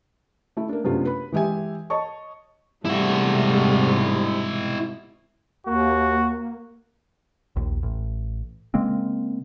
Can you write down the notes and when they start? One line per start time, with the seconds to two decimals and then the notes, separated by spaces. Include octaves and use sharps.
0.57 A3 E4
0.69 A#3 D4
0.84 F#2 C3 A3 B3 D4 F4
1.05 B4 B5
1.32 E3 G#3 G4 E5 G#5
1.90 C#5 D#5 A5 C#6
2.85 G#2 C3 G3 A3 E4 F#4
5.66 D#2 A#3 F#4
7.56 A#1 D#2
7.83 A1
8.74 C#3 G#3 A#3 C4